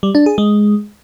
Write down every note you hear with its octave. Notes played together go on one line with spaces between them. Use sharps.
G3
D4
G#4
G#3